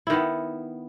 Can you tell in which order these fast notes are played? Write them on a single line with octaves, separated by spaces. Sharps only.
E4 D#3 B3